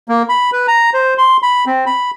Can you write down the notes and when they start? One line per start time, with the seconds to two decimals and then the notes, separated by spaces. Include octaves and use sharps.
0.08 A#3
0.29 B5
0.53 B4
0.68 A#5
0.94 C5
1.18 C6
1.43 B5
1.66 C4
1.86 B5